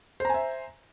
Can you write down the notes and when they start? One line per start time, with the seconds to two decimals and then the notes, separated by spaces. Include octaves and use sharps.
0.20 C5
0.25 A#5
0.30 G#5
0.34 E5